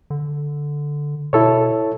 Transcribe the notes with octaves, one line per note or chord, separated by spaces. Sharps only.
D3
B2 E4 A4 C#5